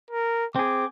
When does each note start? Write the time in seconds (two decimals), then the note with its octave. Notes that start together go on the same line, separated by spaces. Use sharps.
0.11 A#4
0.56 C4 G#4 D6